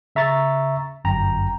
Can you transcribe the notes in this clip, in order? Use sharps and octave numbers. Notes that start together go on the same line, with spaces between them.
C#3 E5 A#5 C#6 A6
G1 F#2 G5 A#5